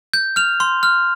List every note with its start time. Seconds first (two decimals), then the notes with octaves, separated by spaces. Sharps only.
0.13 G6
0.36 F6 F7
0.60 C6
0.83 F6